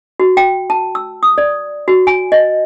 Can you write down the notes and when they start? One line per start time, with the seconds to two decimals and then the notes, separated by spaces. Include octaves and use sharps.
0.20 F#4
0.37 G5
0.70 A5
0.95 E6
1.23 D#6
1.38 D5
1.88 F#4
2.07 G#5
2.32 D#5